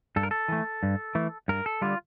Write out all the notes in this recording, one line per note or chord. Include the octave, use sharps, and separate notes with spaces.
G2 A4
A#4
A4
E3 A3
G2
E3 A3
G2 A#4
A4
D3 G3 F4